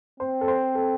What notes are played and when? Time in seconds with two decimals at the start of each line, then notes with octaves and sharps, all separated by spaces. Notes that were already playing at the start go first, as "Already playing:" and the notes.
0.20 C4 C5
0.41 A4
0.48 C5
0.75 A4